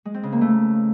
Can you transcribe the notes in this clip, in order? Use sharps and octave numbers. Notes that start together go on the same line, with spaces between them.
G#3
C4
C#3
A#3
A3